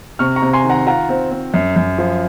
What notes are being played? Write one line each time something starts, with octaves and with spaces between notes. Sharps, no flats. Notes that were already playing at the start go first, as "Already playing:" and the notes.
C3 C#6 F6
A#5 C#6
C3
G#5 C6
D#3
F#5 A#5
F4 F#5 A#5
C4
C4
F#2
F#2
F3